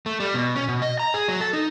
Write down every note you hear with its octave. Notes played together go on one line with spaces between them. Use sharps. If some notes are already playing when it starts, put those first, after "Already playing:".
A3
G3
B2
C#4
B2
D#5
A#5
G#4
F#3
A4
D#4